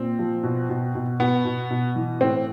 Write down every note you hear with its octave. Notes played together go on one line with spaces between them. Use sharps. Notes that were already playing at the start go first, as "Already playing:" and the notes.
Already playing: A#2 C4
F3
B2
B2
B2
B2 B3
B2
B2
E3
A2 C4